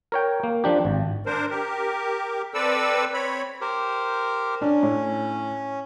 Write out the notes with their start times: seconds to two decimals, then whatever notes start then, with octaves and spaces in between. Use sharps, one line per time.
0.12 A#4 C#5 G5
0.43 A#3
0.64 F3 D4 G4
0.85 G#1
1.26 D4 A#4 C5
1.50 G4 A#4
2.54 C4 A4 B4 D5 E6
3.14 C4 C#5 B5
3.61 G4 A#4 C5
4.61 C#4 D4
4.83 A2